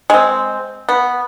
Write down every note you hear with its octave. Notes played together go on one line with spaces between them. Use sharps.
G#3 C4
B3